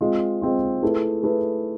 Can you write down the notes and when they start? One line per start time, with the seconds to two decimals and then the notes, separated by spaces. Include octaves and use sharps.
0.01 G#3 C4 F4
0.42 G#3 C4 F4
0.83 A3 E4 G#4 B4
1.23 A3 E4 G#4 B4